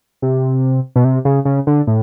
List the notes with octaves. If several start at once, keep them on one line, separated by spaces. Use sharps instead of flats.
C3
B2
C3
C#3
C#3
D3
A2